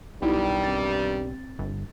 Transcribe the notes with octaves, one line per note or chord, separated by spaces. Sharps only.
B1 G2 D#3 G3 B3 D#4 E4
C4 A6
G1